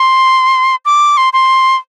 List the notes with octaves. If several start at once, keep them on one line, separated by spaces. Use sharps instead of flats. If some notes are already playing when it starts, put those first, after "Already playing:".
Already playing: C6
D6
C6
C6